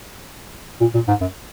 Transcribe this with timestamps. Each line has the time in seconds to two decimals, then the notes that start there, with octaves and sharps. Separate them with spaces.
0.81 A#2
0.94 A#2
1.08 G#2
1.21 F#2